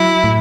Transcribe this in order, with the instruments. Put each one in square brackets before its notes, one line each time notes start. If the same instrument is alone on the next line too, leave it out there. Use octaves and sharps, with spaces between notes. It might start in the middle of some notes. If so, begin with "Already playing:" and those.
Already playing: [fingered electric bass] F#3 [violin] E4
[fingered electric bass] A2